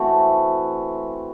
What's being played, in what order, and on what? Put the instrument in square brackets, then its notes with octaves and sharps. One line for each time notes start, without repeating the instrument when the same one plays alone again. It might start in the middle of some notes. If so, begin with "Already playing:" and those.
Already playing: [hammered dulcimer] E3 A3 C4 F#4